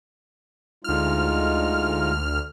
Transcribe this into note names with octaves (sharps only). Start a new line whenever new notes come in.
D2 G#3 D#4 F4 F6